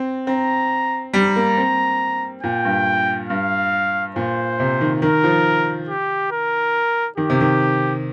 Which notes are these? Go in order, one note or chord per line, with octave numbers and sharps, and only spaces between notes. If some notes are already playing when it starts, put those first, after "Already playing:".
Already playing: C4
C4 A#5
G3 A#5
A#3
C4
A#2 G5
G2
G2 F5
A#2 C5
C3
D#3
D#3 A#4
F3
G4
A#4
D#3 G4
C3
D#3